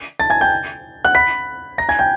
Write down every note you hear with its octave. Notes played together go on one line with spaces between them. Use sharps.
A5 A6
G#5 G#6
G5 G6
F#5 F#6
B5 B6
A#5 A#6
G#5 G#6
G5 G6